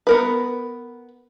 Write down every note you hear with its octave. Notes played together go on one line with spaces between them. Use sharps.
B3 A#4 B4